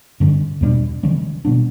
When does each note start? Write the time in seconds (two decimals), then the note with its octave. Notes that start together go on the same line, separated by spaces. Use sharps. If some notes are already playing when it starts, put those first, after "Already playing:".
0.20 G2 D3 G3 C#4
0.61 E2 B2 G3 D4
1.03 C#3 E3 G3 C#4
1.45 B2 G3 B3 D4